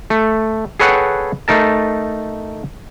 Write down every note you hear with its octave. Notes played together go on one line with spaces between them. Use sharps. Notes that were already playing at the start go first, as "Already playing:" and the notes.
A3
G#4 A4 B4 C#5 F#5 G5
A3 D#4 A#4 A5